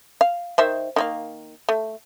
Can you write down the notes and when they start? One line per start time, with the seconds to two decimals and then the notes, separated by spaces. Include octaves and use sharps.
0.21 F5
0.58 D#3 C5 E5
0.96 D#3 A#3 F5
1.69 A3